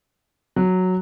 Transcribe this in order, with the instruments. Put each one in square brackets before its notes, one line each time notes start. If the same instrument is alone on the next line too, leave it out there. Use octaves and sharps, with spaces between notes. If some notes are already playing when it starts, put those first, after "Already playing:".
[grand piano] F#3